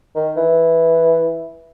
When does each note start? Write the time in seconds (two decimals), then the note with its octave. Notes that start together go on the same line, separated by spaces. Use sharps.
0.15 D#3
0.37 E3